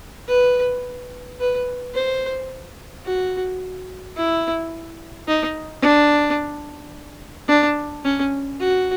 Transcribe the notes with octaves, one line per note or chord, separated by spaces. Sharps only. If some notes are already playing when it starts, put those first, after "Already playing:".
B4
B4
C5
F#4
E4
D#4
D4
D4
C#4
F#4